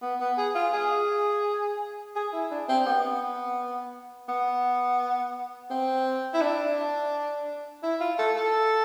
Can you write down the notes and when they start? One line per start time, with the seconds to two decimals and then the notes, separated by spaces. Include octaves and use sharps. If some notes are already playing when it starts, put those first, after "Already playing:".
0.02 B3
0.20 B3
0.38 G#4
0.55 F4
0.73 G#4
2.16 G#4
2.33 E4
2.51 D4
2.69 C4
2.86 B3
4.28 B3
5.70 C4
6.34 E4
6.41 D4
7.83 E4
8.01 F4
8.19 A4
8.36 A4